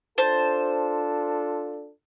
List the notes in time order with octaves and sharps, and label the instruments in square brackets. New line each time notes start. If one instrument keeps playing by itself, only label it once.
[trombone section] D4 F4 A4 [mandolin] C5 A5